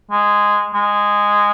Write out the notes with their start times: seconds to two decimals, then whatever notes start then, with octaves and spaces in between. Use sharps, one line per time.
0.11 G#3
0.74 G#3